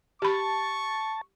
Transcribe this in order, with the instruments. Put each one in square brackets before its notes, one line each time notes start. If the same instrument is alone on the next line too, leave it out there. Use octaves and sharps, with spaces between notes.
[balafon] G4 B5 [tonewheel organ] A5 [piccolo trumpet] C#6